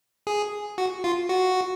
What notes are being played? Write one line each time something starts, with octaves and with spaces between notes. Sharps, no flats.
G#4
F#4
F4
F#4